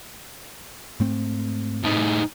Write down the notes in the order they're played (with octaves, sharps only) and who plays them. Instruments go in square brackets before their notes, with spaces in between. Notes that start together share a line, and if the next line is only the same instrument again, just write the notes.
[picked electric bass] G#2 A3 C4
[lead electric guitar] A2 D#4